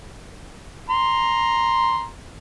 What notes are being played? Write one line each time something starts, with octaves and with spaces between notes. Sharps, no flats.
A#5 C6